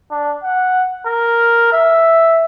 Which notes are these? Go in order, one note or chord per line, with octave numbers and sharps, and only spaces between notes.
D4
F#5
A#4
E5